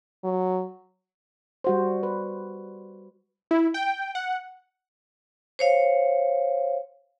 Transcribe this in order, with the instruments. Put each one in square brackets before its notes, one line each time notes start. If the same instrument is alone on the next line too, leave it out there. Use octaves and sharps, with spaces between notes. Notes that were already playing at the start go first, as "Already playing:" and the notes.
[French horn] F#3
[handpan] G3 F#4 C5
B4
[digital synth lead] E4
G5
F#5
[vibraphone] C5 C#5 F5